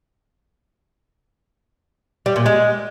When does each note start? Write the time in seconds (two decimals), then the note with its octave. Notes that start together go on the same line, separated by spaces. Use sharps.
2.26 G3
2.36 A#2
2.46 G#3